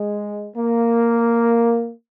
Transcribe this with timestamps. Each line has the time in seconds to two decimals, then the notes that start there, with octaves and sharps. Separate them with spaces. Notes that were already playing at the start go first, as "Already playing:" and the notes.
Already playing: G#3
0.55 A#3